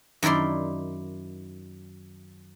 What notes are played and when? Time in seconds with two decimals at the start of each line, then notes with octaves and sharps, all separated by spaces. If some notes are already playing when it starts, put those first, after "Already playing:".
0.23 F#2 D#3 E4 D5 C6